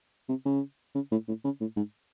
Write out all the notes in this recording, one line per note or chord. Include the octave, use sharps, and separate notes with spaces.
C3
C#3
C#3
A2
A2
C#3
A2
G#2